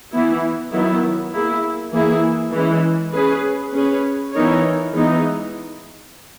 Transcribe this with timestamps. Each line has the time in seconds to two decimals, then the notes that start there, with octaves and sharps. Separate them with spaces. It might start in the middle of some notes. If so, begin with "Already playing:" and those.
0.12 E3 B3 E4
0.72 D#3 F#3 B3 E4
1.32 A#3 E4 G#4
1.92 E3 A#3 E4 G#4
2.53 E3 G#3 C#4
3.13 C#4 G#4 B4
3.73 C#4 G#4 B4
4.33 E3 B3 D#4 A#4 C#5
4.94 E3 G#3 B3 D#4